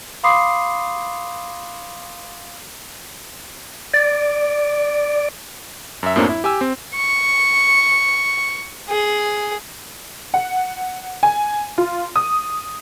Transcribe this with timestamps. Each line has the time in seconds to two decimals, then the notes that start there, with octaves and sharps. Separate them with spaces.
0.23 F5 B5 C6 D6 D#6 C7
3.94 D5
6.03 F#2 E5
6.16 F#2 A2 F#3 A#3 C4 D4
6.29 E4
6.44 G4 G#5 E6
6.61 C4
6.95 C#6
8.89 G#4
10.34 F#5
11.23 G#5
11.78 F4
12.16 D#6